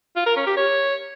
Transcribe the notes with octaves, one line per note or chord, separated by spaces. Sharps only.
F4
A#4
C#4
G4
C#5